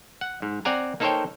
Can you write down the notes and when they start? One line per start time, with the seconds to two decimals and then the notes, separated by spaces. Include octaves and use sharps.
0.21 F#5
0.42 G#2
0.65 C4 D5 F#5 G#5 A#5
1.00 A#3 D#4 A4 C5 C#5 G5